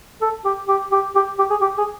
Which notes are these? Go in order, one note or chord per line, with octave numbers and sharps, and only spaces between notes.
A4
G4
G4
G4
G4
G4
G#4
G4
G#4